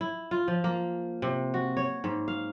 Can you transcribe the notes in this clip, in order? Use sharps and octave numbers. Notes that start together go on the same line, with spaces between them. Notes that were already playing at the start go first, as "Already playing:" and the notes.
E4
F4
F3
A#3
C3
F#4
C#5
G#2
F5